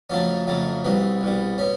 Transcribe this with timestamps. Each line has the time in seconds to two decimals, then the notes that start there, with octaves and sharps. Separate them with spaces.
0.10 F2 C#3 F#3 A3 C#4
0.47 F2 C#3 F#3 A3
0.84 C2 B2 G3 C4
1.21 C2 B2 G3
1.58 B2 C#4